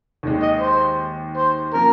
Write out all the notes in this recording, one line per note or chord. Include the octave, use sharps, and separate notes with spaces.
D#2 D#3 G#3
D#5
C5
C5
F3 A#3 C#4 A#4